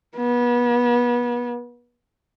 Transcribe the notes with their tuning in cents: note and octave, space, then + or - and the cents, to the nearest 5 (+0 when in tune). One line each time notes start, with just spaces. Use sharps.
B3 -30